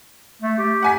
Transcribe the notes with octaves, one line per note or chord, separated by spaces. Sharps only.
A3
G4
F#5 G#5 B6